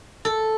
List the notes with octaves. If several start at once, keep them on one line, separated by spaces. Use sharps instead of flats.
A4